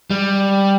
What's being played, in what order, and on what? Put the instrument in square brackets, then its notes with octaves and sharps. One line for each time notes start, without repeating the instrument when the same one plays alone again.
[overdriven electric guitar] G3